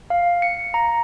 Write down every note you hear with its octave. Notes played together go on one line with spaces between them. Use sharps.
F5
C#7
A#5